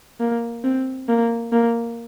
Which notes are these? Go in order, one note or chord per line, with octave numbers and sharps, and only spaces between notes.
A#3
C4
A#3
A#3